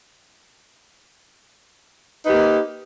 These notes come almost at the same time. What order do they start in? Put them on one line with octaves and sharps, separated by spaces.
B4 D#4 G4 A#3